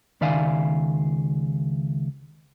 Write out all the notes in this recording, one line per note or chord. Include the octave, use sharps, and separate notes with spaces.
C#2 D#3 D5 E5 F5 G#5